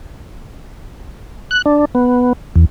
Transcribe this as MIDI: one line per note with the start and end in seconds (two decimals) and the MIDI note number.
1.51 1.62 90
1.66 1.85 62
1.95 2.33 59
2.56 2.65 40